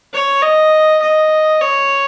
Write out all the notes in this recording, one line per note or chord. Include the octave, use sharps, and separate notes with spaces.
C#5
D#5
D#5
C#5